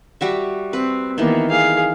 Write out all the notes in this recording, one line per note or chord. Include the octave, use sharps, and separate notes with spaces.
G3 F#4 E5
C4 B4
D#3 E3 A#3 B3
G#4 F5